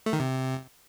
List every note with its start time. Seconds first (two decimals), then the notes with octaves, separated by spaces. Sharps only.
0.06 A3
0.13 D#3
0.20 C3